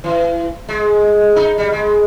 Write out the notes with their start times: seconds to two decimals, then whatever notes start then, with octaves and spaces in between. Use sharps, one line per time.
0.04 E3
0.69 G#3
1.36 D#4
1.58 G3
1.72 G#3